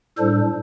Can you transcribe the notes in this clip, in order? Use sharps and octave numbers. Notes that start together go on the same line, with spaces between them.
A2 G3 D4 A4 C5